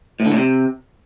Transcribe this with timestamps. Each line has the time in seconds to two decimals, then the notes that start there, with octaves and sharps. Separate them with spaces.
0.20 A2
0.26 D3
0.32 A2
0.38 C3